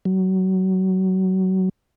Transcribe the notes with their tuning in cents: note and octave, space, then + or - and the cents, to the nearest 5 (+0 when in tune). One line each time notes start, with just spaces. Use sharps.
F#3 +25